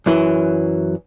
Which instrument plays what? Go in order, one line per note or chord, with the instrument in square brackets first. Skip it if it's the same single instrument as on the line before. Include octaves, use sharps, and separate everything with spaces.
[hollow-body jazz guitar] F#2 E3 F#3 E4